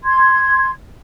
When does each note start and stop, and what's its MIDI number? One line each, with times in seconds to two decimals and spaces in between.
0.05 0.70 84
0.05 0.70 92